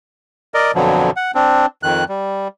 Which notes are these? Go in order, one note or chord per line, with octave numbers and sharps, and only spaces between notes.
A#4 D5 D#5
F2 B2 D3 F3 F#3
F#5
C4 D4
F2 D#3 F#6
G3